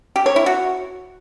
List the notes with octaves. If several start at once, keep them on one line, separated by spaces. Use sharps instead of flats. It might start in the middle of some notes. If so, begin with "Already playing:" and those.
G4
C#5
E4
F#4